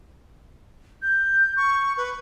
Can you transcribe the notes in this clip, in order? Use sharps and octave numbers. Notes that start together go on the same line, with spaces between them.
G6
C#6
B4